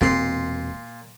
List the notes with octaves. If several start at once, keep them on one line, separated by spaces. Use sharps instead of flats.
E1 A#2 C4 C6